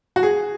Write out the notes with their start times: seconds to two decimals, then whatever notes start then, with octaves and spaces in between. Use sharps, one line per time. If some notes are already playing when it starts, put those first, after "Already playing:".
0.16 F#4
0.23 G#4